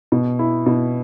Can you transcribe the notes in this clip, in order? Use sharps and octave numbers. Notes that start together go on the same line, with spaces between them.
B2
E4
B2